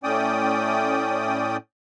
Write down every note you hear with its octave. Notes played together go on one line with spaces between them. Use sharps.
A2 C#4 D5 G5 D#6